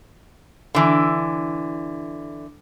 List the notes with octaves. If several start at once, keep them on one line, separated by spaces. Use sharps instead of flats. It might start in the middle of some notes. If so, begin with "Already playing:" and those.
D3 E3